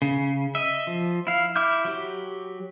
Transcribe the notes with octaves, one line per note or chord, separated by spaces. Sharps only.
C#3
D#5 E5
F3
E4 F5
E4 E5 D6 F6 G6
F#3 G4